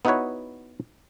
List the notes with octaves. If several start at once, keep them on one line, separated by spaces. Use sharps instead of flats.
B3 D#4 E4 F#4 B4 C#5